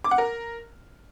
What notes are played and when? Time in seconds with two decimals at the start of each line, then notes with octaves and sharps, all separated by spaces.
0.04 D6
0.11 F#5
0.18 A#4